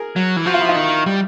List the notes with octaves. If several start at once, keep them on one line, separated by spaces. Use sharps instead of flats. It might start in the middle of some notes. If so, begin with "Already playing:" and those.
Already playing: G#4 A#4
F#3
E3
F3 F#4
F4
E4
D#4 F4
D#3
G3